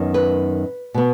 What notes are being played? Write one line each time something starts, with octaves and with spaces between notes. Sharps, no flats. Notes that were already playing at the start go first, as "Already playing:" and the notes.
Already playing: F#2 D#3 B3
B4
B2 B3